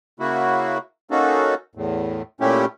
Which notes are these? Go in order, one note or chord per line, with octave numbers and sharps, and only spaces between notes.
C#3 A#3 E4 F#4
A#3 C#4 D#4 F#4 A4
E2 A2
A#2 A3 C#4 E4 G4